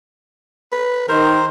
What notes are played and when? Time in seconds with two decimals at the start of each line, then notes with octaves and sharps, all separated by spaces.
0.72 B4
1.09 D#3 A#4 C5